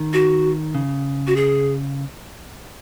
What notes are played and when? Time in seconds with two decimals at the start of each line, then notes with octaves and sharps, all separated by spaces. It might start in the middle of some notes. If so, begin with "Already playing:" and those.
Already playing: D#3
0.13 F#4
0.75 C#3
1.27 F#4
1.36 G#4